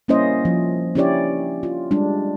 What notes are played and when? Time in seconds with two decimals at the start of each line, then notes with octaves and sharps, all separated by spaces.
0.08 G3 A#3 C#4 E4 C5 D#5
0.45 F3
0.95 C#4 D4 E4 G4 C#5 D5
1.63 F4
1.91 G3 G#3 D4